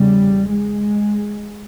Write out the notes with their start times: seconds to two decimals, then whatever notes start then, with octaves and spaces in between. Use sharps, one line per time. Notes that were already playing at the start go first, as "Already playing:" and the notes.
Already playing: E2 C#3 G3
0.52 G#3